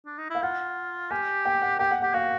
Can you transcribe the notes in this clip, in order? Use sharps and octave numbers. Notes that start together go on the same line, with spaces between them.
D4
D#4
E4 F5
F4 F#5
G4 G#5
G5
F#5
G4 G5
F#5
G4 F#5
F#4 F5